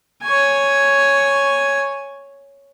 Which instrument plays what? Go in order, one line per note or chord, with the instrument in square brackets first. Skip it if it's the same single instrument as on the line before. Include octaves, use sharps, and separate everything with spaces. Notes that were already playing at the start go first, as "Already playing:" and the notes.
[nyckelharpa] C#5 G#5